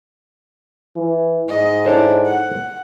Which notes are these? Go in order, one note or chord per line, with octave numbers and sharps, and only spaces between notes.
E3
G#2 D#5
D4 E4 A4 C5 C#5
F#5